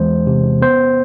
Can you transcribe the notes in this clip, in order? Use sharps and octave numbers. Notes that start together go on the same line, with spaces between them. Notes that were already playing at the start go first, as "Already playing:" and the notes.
Already playing: E2 E3 G#3 C5
C3
B3 C5